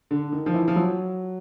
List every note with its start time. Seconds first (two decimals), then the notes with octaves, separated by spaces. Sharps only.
0.11 D3
0.32 D#3
0.46 F3
0.54 E3
0.68 F3
0.76 F#3